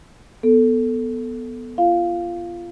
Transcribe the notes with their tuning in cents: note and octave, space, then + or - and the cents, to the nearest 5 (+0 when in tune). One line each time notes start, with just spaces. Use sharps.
B3 +0 A4 +0
F4 -25 F5 +0